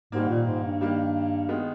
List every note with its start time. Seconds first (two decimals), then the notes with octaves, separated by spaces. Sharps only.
0.12 G#2 D#3 G3 A#3
0.29 A#2
0.47 G#2
0.64 G2
0.81 D#3 G3 A#3
1.49 D#3 G#3 B3